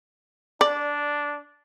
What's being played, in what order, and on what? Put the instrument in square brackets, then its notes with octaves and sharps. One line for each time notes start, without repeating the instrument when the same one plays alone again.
[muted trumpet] D4 [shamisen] D5